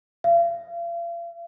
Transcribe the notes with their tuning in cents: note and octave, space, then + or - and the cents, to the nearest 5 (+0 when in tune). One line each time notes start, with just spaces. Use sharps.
F5 -40